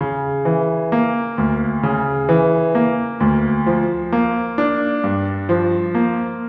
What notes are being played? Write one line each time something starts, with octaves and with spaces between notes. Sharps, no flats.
C#3
E3
A#3
D2
C#3
E3
A#3
D2
F3
A#3
D4
G2
F3
A#3